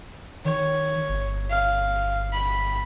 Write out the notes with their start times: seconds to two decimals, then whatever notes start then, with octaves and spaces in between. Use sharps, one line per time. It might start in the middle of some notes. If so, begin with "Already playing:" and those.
0.45 D#3 C#5
1.09 G1
1.50 F5
2.33 B5